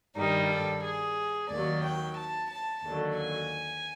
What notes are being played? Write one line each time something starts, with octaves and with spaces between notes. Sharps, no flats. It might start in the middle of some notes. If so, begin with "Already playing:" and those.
G2 D#3 G3 D#4
A4
G#4
D#2 D#3 F#3 D5
G5
A5
A5
D#2 D3 F#3
G#5